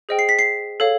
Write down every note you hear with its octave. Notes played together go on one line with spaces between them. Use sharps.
G#4 C5 D#5 G5
C7
B6
C7
A4 C#5 F5